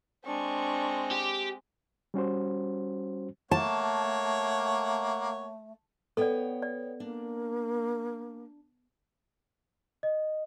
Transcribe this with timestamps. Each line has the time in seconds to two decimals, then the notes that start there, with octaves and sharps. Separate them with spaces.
0.25 G#3 C4 D4 C#6
1.11 G4
2.14 G3 C#4 F#4 C5
3.51 A3 A#3 C#5 F#5 A5
6.17 B3 A4 C#5 D5 G5
6.62 D5
7.00 A#3 D4
10.03 D#5